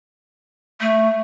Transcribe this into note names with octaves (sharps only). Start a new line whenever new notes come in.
A3